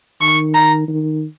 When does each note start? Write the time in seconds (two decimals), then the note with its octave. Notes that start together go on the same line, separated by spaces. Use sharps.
0.21 D#3 C#6
0.55 A#5
0.88 D#3